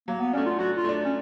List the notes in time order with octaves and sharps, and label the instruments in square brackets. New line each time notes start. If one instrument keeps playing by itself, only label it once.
[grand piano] F#3 [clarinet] A#3
[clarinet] B3
[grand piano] A3 D4 [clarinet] C#4
[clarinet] F4
[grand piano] F#3 [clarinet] F#4
[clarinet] F4
[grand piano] A3 D4
[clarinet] C#4